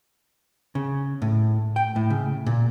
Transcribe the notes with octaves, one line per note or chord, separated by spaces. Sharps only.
C#3
A2
G5
A2
C#3
A#2